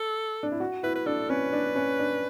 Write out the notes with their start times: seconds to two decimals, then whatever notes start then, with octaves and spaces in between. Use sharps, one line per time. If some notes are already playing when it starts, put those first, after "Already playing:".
Already playing: A4
0.43 D4
0.52 E4
0.60 F#4
0.83 E4 B4
0.95 B4
1.06 D4 A4
1.30 C#4 B4
1.53 D4
1.76 C#4
1.99 D4